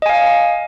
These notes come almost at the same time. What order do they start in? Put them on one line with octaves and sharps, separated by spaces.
D#5 G#5 F5